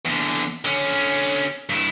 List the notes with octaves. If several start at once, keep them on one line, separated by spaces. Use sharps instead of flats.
E2 D3
D3 C#4
G2 E4